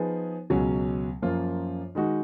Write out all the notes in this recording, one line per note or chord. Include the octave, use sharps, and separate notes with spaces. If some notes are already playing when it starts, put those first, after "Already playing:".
Already playing: F3 B3 D#4 G#4
C#2 B2 F#3 C#4
F#2 F3 A#3 F4
D#3 G#3 D#4 F#4